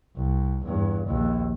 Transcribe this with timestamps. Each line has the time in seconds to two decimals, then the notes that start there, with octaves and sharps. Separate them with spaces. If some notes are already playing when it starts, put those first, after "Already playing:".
0.16 C2
0.65 E2 G2
1.07 A#1 D#2